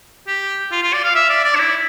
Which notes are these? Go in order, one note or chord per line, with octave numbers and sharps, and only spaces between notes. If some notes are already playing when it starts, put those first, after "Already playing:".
G4
F4
F4
D5
F5
E5
D5
D5
D4
E4